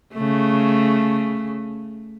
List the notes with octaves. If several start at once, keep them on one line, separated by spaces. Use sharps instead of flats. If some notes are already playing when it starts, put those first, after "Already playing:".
C#3 A3